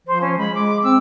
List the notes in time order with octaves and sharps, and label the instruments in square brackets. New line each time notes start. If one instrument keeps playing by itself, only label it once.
[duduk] F3 [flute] C5
[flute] C#4
[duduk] G#3 [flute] B5
[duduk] G#3 [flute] D6
[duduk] C4 [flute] E6